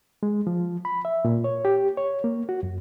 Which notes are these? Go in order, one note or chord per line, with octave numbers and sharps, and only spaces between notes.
G#3
F3
B5
E5
A#2
C#5
G4
C#5
A#3
F#4
F#2